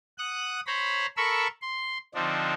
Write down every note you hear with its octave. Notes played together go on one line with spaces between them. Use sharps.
F#5 D#6 F#6
C5 C#5 A#5 B5
A4 A#4 B5 C#6 E6
C6
D3 F3 C4 D4 D#4